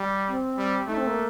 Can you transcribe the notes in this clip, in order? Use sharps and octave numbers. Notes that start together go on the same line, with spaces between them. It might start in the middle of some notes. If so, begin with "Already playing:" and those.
Already playing: G3
C4
G3
A3 D#4
C4
A#3